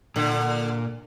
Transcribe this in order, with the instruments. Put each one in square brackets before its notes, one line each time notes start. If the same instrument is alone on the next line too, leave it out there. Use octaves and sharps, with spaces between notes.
[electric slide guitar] A#2 A#3 [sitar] D3